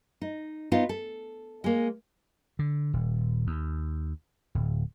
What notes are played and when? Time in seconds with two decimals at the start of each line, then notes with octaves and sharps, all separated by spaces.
0.22 D#4
0.72 B3 D#4 F4
0.89 A4
1.64 G#3 A#3
2.59 D3
2.93 D#1
3.47 D#2
4.55 D1